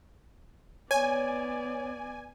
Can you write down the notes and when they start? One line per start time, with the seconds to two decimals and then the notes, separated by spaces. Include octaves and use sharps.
0.91 B3 C#5 D5 G#5